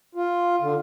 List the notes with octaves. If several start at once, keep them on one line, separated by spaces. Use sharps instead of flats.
F4
D3